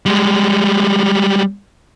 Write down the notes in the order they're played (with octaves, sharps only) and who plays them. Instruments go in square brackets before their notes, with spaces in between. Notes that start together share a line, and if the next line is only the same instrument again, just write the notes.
[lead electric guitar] G3 G#3